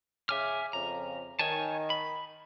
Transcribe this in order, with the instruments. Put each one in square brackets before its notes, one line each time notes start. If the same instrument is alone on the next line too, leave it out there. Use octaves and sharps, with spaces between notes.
[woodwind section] C#3 D6 [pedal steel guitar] E5 G#5 F6
[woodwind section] F2 C#3 [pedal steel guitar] A#5
[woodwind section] D#3 [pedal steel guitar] C#5 G#5 A5
[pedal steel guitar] B5